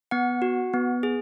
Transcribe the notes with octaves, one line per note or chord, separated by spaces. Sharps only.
B3 F#5
F#4
B3
G#4